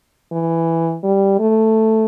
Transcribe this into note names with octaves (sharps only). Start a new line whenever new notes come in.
E3
G3
A3